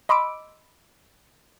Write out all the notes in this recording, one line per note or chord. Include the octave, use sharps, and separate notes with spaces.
D#5 B5 C6 D6 E6 D7